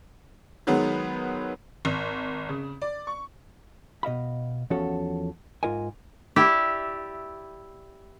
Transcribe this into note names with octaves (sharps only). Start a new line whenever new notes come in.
D#3 F#3 G#3 B3
G#1
C#3
D5
C#6
B2 D#5 F5 B5
E2 F3 C#4 F#4 A4 C#5
G#2 F4 A#4 D#5 G#5
E4 G4 D5 E5